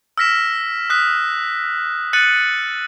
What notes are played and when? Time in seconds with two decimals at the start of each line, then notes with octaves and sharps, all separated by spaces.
0.18 E6 F6 A#6 B6 E7
0.90 D#6 F#6 B6
2.13 F#6 A6 C#7 D#7 F#7